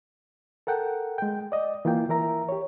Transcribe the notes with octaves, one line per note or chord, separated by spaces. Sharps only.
A4 A#4 F#5 G5
G#3 G5
D5 D#5
E3 A#3 F4 G5
E3 A#4 E5 A#5
G4 C#5